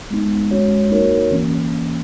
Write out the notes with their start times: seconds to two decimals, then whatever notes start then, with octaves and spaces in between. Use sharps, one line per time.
0.11 G#3 B3 D#4
0.51 G#3 C#4 F#4 C#5
0.91 A#3 D#4 F#4 A#4 C#5
1.31 E3 A#3 C#4